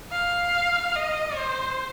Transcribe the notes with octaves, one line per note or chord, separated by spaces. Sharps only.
F5
D#5
C5